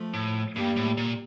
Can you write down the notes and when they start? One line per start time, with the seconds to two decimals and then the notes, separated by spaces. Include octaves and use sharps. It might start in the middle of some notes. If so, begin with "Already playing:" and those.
Already playing: F3 A3
0.14 A2
0.55 G2 G3 A#3
0.76 A2
0.97 A#2